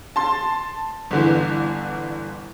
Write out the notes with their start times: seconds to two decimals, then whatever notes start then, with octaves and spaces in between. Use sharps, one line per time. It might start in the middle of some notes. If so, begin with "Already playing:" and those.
0.16 A5 C6 A6
1.11 G1 D3 E3